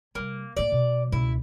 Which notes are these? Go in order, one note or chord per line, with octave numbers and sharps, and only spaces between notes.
C3 G3 A#3
A2 A#3 D5
B2
C#2 B2 E4